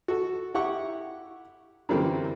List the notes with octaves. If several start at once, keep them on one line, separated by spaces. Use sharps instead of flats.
F#4 A4
E4 G4 F#5 C#6
F#2 D3 E3 G3 A#3 C4